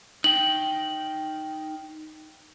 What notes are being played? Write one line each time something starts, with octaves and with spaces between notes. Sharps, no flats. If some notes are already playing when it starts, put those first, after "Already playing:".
D#4 G5 F#7